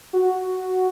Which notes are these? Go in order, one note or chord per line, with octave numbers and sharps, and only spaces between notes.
F#4